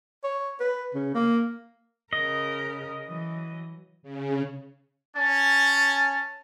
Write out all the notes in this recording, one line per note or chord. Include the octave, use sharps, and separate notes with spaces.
C#5
B4
C#3
A#3
C#3 A#4 D#5
E3 F#3
C#3
C#4 A5